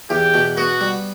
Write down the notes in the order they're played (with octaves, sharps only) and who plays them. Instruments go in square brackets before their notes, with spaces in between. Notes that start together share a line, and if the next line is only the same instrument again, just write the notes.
[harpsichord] E2 [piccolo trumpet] G4
[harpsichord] B2
[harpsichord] B3 [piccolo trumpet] F#4
[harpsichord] G3